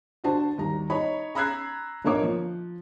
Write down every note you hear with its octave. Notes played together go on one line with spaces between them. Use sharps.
D3 D4 F#4 C5 A5
D#2 G3 A#5
D#4 C#5 B5
A#5 B5 E6 F#6 G#6 C7
A#1 D3 A#3 D#4 C#5 D6
F3